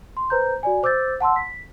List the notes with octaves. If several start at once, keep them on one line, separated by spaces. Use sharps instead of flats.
C6
B4 C5 A#5 G6
F#4 D5 G#5
C5 D6 E6 G6 A6
F#5 A5 C6 E6
B6